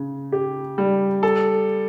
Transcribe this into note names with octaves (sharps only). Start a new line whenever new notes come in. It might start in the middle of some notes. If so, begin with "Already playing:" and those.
Already playing: C#3
G4
G3
A4